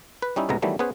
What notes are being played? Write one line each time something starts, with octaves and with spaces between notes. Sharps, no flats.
B4
G3 C#4 D#4 E4
C#2 A2 C3 G#3 B3 A#5
D#3 E3 F#3 G3 A3 B3
B3 C#4 G#4 B4 C5